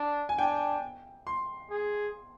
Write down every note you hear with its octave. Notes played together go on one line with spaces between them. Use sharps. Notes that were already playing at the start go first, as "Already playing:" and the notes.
Already playing: D4
G#5
D4 G5
C6
G#4